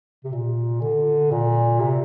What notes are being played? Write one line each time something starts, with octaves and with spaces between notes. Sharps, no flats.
C3
A#2
D3
A#2
C3